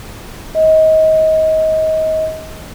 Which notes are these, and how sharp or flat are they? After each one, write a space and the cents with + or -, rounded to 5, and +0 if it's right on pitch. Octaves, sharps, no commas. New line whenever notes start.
D#5 +25